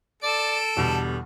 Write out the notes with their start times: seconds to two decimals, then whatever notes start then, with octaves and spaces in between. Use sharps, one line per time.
0.23 A4 D5 D7 E7
0.77 E2 B2 D3 G3